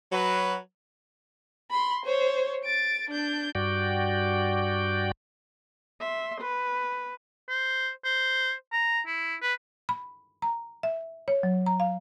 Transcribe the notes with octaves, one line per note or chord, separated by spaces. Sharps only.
F#3 B4
B5 C6
C5 C#5
A6 D7
D4 G6
G2 F#4 D5 G5
E5 C6
B4
C5
C5
A#5
E4
B4
B5
A#5
E5
C#5
F#3
A#5
F5